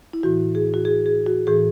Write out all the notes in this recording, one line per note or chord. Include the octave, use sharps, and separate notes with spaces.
E4
A2 E3 F#4
G#4
F#4
G#4
G#4
F#4
A2 E3 G#4